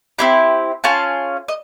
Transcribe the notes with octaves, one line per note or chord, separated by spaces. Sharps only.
C4 E4 G4 C6
C#4 F4 G#4 A5
D#5